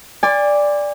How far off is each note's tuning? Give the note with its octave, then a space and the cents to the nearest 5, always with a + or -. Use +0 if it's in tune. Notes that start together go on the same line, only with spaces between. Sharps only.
D5 +0 G#5 -40 C6 -10